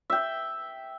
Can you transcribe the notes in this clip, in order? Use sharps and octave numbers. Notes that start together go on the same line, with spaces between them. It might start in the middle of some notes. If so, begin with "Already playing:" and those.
E5 G5